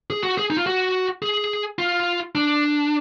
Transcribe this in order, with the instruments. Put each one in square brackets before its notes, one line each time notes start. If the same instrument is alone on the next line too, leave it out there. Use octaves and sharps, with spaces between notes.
[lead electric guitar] G#4
F#4
G#4
D#4
F4
F#4
G#4
F4
D4